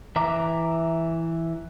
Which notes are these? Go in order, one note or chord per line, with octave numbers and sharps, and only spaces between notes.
E3 E5 A#5 D6